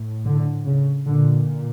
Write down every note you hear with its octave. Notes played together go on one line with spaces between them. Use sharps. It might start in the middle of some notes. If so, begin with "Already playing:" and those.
Already playing: A2
D3
C#3
A#2 D3